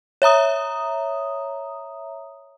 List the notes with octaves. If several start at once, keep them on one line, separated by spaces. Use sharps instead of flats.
C#5 E5 A#5 D#6